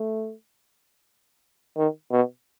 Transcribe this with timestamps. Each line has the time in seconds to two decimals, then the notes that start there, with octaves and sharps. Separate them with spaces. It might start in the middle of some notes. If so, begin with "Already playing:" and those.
Already playing: A3
1.77 D#3
2.11 B2